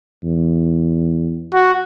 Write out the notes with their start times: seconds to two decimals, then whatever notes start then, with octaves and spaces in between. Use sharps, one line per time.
0.23 E2
1.54 F#4